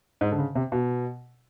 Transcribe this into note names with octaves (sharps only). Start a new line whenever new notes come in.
G#2
D3
C#3
C3
B2